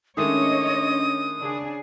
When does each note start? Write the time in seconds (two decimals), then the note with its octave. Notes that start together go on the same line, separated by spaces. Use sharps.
0.17 D#3 G#3 A3 C#4 D4 C#5 D#5 D#6
1.39 C#3 D4 G#4